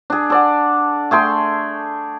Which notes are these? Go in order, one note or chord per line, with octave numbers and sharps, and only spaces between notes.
D4 G#4
A4 D5 F#5
A3 G#4 G5 C6